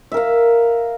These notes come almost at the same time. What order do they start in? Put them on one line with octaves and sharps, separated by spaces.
E5 A#4 F5